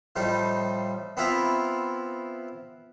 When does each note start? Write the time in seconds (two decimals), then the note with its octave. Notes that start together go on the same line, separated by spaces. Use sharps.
0.16 A2 F3 G3 D#4
1.17 B3 C4 E4 F4 E5 A#5